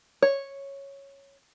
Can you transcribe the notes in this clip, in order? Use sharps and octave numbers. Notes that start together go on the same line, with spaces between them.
C#5